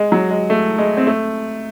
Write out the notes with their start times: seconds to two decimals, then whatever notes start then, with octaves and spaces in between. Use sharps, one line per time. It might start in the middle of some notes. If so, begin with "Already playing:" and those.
Already playing: G#3
0.12 F#3
0.30 G#3
0.50 A3
0.78 G#3
0.97 C4
1.07 A3